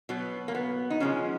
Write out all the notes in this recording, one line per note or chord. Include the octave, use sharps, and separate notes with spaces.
B2 F#3 B3
A#3
B3
D#4
C#3 F3 G#3 C#4